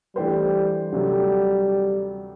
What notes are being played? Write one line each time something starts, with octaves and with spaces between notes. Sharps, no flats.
E3 G3 A3 D4 G4 C5
D2 C3 F#3 G3 A3